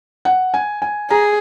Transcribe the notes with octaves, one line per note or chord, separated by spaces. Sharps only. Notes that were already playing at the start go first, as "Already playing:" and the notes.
F#5
G#5
G#5
G#4 A#5